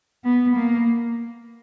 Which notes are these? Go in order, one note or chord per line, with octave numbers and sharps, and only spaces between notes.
B3
A#3